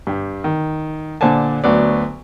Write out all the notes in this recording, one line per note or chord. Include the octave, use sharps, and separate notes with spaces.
G2 G4
D#3
A#2 D3 C5 D5 G#5 A5
D2 F#3 B3 D5